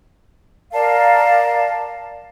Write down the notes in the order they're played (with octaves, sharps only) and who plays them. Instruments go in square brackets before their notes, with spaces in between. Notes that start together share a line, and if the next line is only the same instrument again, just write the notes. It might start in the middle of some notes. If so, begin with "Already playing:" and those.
[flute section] A#4 D5 F5 A5